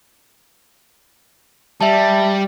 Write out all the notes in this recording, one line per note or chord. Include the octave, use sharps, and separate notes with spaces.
G3 E5 A5